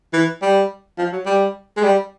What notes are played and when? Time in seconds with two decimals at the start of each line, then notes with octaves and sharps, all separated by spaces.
0.13 E3
0.42 G3
0.98 F3
1.13 F#3
1.26 G3
1.77 G#3
1.83 G3